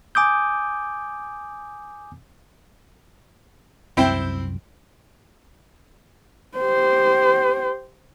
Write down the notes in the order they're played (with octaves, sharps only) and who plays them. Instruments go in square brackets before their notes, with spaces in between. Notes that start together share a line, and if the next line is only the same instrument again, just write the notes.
[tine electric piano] G#5 D6 D#6 G6
[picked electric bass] C2 F#2 [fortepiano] C4 E4 G5
[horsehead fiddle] G4 C5